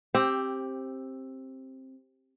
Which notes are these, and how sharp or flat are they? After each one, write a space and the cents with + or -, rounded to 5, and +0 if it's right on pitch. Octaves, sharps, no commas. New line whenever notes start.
C4 +15 G4 +0